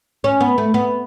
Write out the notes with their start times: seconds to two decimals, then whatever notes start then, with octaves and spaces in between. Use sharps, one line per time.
0.24 C#4
0.40 B3
0.58 A3
0.74 B3